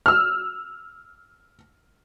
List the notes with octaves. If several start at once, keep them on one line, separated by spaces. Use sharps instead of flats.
E6 F6